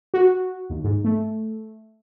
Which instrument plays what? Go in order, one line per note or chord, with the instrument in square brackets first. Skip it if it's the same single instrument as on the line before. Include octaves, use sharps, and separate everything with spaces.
[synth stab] F#4
D#2
G#2
A3